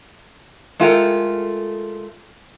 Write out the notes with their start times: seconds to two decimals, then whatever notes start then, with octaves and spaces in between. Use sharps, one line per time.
0.80 G#3 A3 F4 A4 A#4 G5